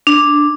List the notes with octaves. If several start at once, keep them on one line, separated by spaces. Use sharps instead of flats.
D4